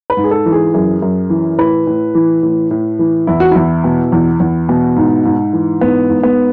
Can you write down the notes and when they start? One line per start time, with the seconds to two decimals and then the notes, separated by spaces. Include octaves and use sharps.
0.10 B4
0.17 G#2
0.24 G#4
0.31 A4
0.46 E3
0.52 G#4
0.74 F#2 G#4
1.02 F#2
1.30 E3
1.58 A2 B4
1.87 A2
2.15 E3
2.43 A2
2.71 A2
2.99 E3
3.27 E2 E4
3.40 F#4
3.52 E2 E4
3.84 B2
4.12 E2
4.40 E2
4.69 B2
4.96 G#2
5.25 G#2
5.53 E3
5.81 G#2 B3
6.10 G#2
6.23 B3